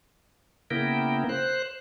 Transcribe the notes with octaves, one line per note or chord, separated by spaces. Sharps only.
C#3 A#3 B3 E4 A#4 G5
C5 F#6